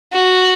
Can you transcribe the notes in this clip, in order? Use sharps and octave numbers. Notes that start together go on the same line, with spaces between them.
F#4